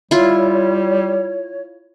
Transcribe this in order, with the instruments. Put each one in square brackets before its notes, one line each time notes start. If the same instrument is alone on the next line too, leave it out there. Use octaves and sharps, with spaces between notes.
[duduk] G3 [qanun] E4 F4 [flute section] C#5